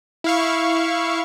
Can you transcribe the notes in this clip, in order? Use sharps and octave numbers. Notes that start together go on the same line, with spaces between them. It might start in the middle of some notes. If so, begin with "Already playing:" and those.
E4 F5 C#6